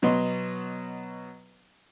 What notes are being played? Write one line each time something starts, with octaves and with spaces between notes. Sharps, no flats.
B2 F#3 B4 D#5 C6